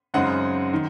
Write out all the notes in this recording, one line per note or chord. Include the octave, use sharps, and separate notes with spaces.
F#2 C#3 G#3 C4 D#4 F#5
D#3